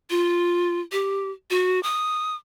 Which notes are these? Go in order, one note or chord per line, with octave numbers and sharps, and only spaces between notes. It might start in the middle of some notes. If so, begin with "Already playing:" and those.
F4
G4
F#4
D#6